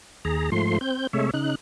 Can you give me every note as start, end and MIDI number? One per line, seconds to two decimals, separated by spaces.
0.25 0.50 39
0.25 0.50 68
0.25 0.50 82
0.52 0.79 44
0.52 0.79 53
0.52 0.79 57
0.52 0.79 84
0.81 1.07 60
0.81 1.07 91
1.13 1.31 48
1.13 1.31 56
1.13 1.31 57
1.13 1.31 73
1.13 1.31 76
1.34 1.55 49
1.34 1.55 63
1.34 1.55 90